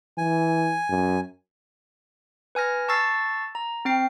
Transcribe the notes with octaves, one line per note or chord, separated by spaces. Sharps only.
E3 G#5
F#2
B4 G#5 F6 A#6
A5 C#6 E6 A6 C7
A#5
C4 G5 C7